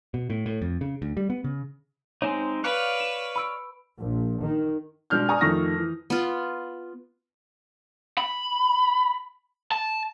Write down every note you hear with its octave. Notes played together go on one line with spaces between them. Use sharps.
B2
A2
A2
F2
C#3
D2
G3
B3
C#3
G#3 C4 D#4 C#5 G#5
B4 C#5 D5 F5 F#6
E7
B5 E6 D7
A#1
D#3
B2 G#3 D4 F6 G6
G#4 D5 G#5 A#5 C#6 D#6
F2 D#3 A3 C#6 D#6 A#6
E3
B3 F4
B5
A5